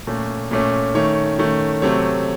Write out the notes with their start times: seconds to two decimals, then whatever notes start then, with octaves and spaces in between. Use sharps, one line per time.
0.07 A#2 A3 C#4
0.51 A#2 A3 C#4
0.95 D#3 A3 C#4 C#5
1.39 D#3 A3 C#4
1.82 C3 F#3 A3 C4 C#5